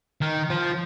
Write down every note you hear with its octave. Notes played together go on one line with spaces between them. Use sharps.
D#3
F3